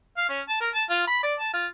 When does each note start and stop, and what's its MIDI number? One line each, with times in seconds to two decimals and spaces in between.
0.17 0.28 77
0.29 0.41 61
0.48 0.56 81
0.61 0.69 70
0.74 0.84 81
0.90 1.03 65
1.07 1.20 83
1.23 1.34 74
1.39 1.52 81
1.54 1.67 65